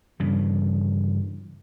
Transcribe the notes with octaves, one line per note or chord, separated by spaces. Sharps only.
G2 C#3 E3